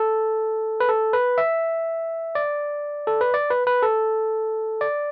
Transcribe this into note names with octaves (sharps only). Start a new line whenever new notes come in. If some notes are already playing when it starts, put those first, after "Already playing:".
Already playing: A4
B4
A4
B4
E5
D5
A4
B4
D5
B4
B4
A4
D5